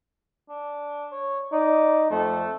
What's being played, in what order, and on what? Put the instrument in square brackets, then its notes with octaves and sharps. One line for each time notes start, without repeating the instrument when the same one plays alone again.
[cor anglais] D4
C#5
[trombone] D#4 [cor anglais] D5
[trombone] F2 [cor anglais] A3